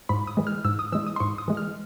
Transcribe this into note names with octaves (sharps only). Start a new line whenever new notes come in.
G#2 B5
D#6
E3 G#3
F6
G#2 E6
D#6
E3 G#3 E6
D#6
C6
G#2 C#6
D#6
E3 G#3
F6